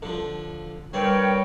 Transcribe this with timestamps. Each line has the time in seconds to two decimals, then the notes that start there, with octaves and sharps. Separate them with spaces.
0.02 D3 F3
0.93 G2 G3 C4 A#4 C#5 G5